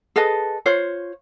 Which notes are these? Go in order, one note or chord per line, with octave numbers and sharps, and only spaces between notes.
G#4 A4 B4 D#5
F4 C5 C#5